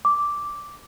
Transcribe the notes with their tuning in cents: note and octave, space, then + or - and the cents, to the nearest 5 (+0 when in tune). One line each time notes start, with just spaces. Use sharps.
D6 -5